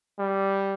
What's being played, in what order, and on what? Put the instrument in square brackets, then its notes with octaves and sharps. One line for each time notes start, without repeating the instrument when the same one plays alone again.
[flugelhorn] G3